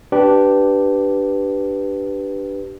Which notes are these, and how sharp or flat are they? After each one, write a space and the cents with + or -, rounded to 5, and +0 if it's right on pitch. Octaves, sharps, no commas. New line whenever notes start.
D4 +0 G4 -10 B4 +0